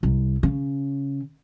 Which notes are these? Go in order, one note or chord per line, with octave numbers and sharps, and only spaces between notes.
C2
C#3